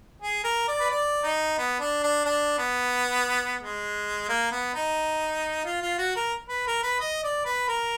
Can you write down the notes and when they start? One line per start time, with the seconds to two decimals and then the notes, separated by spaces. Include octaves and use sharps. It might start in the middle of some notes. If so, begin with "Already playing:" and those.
0.22 G#4
0.44 A#4
0.67 D5
0.80 B4
0.90 D5
1.23 D#4
1.58 B3
1.80 D4
2.03 D4
2.25 D4
2.59 B3
3.60 G#3
4.29 A#3
4.51 B3
4.74 D#4
5.65 F4
5.82 F4
5.98 F#4
6.16 A#4
6.49 B4
6.67 A#4
6.83 B4
6.99 D#5
7.23 D5
7.45 B4
7.68 A#4